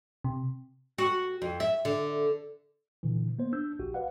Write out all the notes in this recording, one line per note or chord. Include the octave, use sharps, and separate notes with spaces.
C3
F#4
F2
E5
D3
A#2 D3 E3
A#3 B3 C5
D4 E6 G6
A#1 F#4 G4
B4 D5 F5 F#5